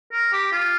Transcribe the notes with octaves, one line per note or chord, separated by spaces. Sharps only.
A#4
G4
F4